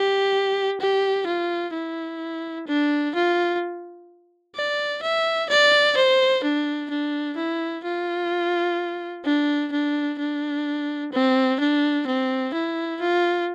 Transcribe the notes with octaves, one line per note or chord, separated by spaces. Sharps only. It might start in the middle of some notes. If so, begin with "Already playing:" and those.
Already playing: G4
G4
F4
E4
D4
F4
D5
E5
D5
C5
D4
D4
E4
F4
D4
D4
D4
C4
D4
C4
E4
F4